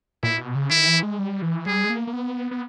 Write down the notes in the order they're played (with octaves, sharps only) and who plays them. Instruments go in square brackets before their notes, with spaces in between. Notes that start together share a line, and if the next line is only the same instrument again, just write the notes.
[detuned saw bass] A#2 [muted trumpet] E4
[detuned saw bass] B2
C#3
[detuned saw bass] D#3 [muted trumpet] E4
[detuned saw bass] E3
G#3
G3
E3
[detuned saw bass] G3 [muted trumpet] G#4
[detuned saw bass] G#3
A#3
A#3
B3
B3